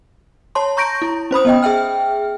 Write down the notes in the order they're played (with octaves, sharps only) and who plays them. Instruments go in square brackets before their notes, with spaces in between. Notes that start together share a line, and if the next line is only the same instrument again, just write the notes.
[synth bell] C#5 A5 C6
A#5 C#6 G6 A#6 D7
E4
C#4 C5 B5 D#6
B3 D#5 G5
G#4 E5 G5 F6